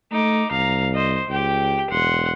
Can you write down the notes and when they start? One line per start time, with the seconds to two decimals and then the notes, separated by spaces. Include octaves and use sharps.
0.12 A3 D#4 D6
0.51 C2 F5 A#5
0.94 C5 D#5
1.29 C#2 G4 G5
1.90 E1 F#5 C6